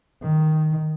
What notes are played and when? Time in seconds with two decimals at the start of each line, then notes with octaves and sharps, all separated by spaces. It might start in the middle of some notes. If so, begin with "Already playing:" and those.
0.22 D#3